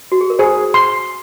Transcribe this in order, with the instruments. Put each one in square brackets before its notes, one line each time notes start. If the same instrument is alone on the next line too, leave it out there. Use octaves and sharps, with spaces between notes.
[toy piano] F#4
G#4
A#4
[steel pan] G#4 [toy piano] C5
[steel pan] C6